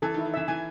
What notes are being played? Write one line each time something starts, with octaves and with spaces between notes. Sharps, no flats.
E3 A4
D#3
E4
D#3
E3 E5
E3 G#5